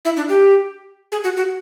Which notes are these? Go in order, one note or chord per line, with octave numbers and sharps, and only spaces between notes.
E4
D4
G4
G#4
F#4
F#4